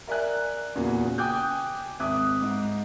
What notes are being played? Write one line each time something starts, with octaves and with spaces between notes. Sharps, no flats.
A#4 D5 E5 G#5 F#6
E2 A#2 C#3 A#3 F#4
G5 G#5 D6 D#6 F#6 G6
G#1 E5 D6 D#6 F#6
G#2